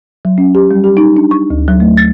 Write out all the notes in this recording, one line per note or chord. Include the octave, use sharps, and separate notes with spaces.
F#3
C#4
G4
G3
G4
D#4
D4
C#6
D2
F#3
A3
A6